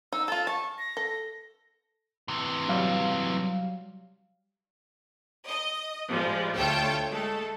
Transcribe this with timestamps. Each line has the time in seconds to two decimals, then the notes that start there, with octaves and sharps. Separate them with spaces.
0.12 D#4 E6
0.28 F4 A4 A6
0.47 A5 C#6
0.78 A#6
0.97 A4
2.28 C3 E3
2.68 F#3 G3 F5
5.47 D#5
6.10 A2 F3 G3 G#3
6.56 D2 A3 F4 C#5 G5 A5
7.08 G#3 A3 A4